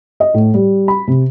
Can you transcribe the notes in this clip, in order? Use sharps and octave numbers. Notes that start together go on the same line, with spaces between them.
D#5
A2
G3
B5
C3